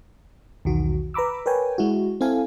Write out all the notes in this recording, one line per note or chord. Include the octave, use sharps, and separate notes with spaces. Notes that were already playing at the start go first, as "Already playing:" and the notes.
B1 E2 D#3 F#4
B4 A#5 B5 D6 E6
A#4 B4 C#5 G5 G#5
G#3 E4 F#4
C4 E4 A4 F5 G#5